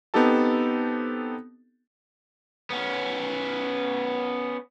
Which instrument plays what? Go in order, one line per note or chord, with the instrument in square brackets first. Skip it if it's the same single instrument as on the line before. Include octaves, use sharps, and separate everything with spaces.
[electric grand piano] B3 C4 D#4 G4 A4 A5
[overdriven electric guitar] B3 C#4